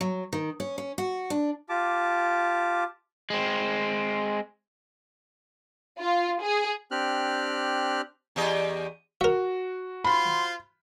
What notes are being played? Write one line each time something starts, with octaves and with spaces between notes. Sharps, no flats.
F#3
D#3
C#4
C#4
F#4
D4
F4 G4 A5 D6
G#3 C4
F4
G#4
C4 D4 G4 F6 F#6
E2 G4 D#5
F#4 A#4 E5
F4 C5 B5 C6